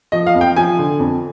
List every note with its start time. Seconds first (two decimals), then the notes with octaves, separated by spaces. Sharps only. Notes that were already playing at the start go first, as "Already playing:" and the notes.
0.12 F3 D#5
0.27 F5
0.35 F2
0.41 G5
0.56 F3 G#5
0.79 D3
1.00 F2